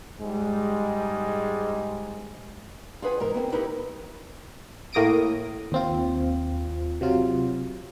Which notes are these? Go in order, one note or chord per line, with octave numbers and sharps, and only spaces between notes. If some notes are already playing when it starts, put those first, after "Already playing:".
G#2 G3 G#3
F4 G#4 B4 F#5 G#5
G#2 E3 A#4
B3 C4 E4 G#4
D#4 E4 G4 A#4 B4
A2 A#3 D#6 A#6 D7 D#7
D#2 C4 F4
C3 F#3 F4